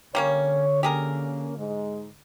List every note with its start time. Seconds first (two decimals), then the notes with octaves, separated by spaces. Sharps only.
0.15 D3 G3 A#3 C#4 C#5
0.83 A#3 C#4 G4 G#4 A#4
1.56 G#2 G#3